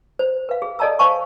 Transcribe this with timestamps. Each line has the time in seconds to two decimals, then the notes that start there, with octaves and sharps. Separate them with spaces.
0.19 C5
0.49 B4 F5
0.62 G#4
0.79 A4 D5 D#5 A5 A#5 E6
0.99 C5 F5 G#5 A5 C#6